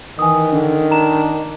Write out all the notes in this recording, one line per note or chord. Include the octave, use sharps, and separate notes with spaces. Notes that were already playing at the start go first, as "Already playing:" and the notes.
D#3 E3 G#5 D#6
D3 D4
D4 A#5 E7